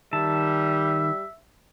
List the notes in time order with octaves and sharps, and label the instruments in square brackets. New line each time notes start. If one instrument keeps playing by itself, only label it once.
[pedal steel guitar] D#3 A5 [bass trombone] G3 [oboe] E5